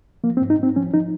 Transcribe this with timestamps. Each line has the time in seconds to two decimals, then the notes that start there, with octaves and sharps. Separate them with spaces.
0.24 F3 A#3
0.37 C4
0.41 G#2
0.50 D#4
0.59 G#2 C4
0.76 F3 C#4
0.93 F3 D#4